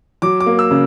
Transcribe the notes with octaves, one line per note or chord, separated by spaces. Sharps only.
F#3 D6
D6
A#3
E6
C#3